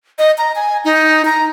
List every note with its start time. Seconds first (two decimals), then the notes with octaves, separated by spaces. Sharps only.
0.18 D#5
0.38 A#5
0.56 G#5
0.85 D#4
1.25 A#5